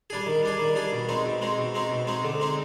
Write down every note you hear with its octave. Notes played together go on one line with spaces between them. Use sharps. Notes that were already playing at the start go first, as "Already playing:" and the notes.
G3 D4 G#4
D#3
G3 D4 G#4
D#3
G3 D4 G#4
B2
G#3 C4 D#4
B2
G#3 C4 D#4
B2
G#3 C4 D#4
B2
G#3 C4 D#4
D3
G#3 C4 D#4